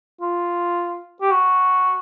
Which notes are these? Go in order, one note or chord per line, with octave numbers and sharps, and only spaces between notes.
F4
G4
F#4